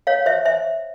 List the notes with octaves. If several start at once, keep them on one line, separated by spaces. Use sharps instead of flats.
C#5 F5
C5 E5
C5 E5